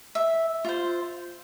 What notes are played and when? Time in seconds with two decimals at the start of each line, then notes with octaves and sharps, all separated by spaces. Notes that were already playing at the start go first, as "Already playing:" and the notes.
0.15 E5
0.65 F4 C5